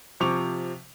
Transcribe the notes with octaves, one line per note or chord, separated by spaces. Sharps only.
C3 F3 C#6 D6 F7